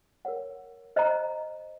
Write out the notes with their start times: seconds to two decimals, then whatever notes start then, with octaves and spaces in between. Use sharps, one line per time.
0.25 A#4 C#5 F#5
0.96 C5 D#5 A#5